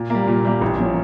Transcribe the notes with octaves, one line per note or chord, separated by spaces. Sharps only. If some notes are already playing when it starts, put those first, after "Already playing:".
Already playing: A#2
G3 A#3
A#2
G3 A#3
A1
F3 A#3 C#4